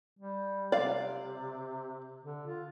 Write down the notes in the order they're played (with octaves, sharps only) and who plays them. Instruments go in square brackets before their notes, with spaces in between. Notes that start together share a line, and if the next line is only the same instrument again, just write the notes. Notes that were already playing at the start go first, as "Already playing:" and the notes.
[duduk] G3
[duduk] C3 [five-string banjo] D5 F5
[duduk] D3
F4